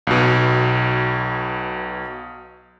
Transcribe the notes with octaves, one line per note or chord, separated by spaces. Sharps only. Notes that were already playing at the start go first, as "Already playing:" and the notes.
B1 B2